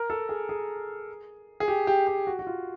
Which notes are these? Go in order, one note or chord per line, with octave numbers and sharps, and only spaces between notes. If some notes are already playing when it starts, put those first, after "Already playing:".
Already playing: A#4
A4
G#4
G#4
G#4
G4
G4
G4
F#4
F#4
F4